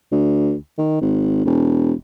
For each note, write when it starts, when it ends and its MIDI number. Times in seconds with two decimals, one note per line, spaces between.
0.12 0.55 38
0.78 0.97 51
1.01 1.43 32
1.45 1.92 28